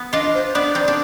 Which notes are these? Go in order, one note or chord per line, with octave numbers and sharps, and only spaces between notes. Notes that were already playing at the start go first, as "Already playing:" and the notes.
Already playing: B3
D4 F4 D#5
C5
B3 D4 D5
C4 D#4
D4